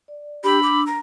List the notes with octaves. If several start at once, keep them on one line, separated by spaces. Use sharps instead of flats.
D5
D4 G4 B5 E6
D6
A#5